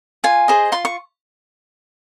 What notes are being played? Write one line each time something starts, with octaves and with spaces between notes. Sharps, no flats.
F4 G#5
G#4 C5 D#5
F4 C6
C#6